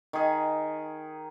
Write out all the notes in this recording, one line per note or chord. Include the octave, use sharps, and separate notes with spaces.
D#3 G#4